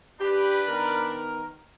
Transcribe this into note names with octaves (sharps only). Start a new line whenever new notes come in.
D4 G4 B4
D#3 B3 A#4